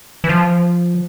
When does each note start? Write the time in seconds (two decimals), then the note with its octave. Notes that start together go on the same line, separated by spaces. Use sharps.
0.24 E3
0.29 F3